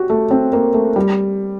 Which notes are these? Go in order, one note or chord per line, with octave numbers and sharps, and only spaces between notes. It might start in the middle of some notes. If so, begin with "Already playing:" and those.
Already playing: F#4 G4
A3
C4
A#3
A3
G3